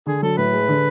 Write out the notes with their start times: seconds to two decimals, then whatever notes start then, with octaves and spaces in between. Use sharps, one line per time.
0.06 D3 G#4
0.22 F#3 A4
0.37 A2 B4
0.53 G#3
0.68 D3